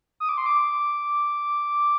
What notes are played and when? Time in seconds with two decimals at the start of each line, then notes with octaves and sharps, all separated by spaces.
0.20 D#6
0.29 D6
0.38 C6
0.46 D6